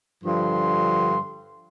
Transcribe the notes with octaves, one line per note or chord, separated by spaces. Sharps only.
G2 D3 F3 C6